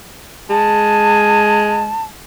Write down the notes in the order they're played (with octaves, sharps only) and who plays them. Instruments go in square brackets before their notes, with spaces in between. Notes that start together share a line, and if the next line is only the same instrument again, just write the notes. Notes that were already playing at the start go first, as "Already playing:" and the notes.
[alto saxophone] G#3 [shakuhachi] A5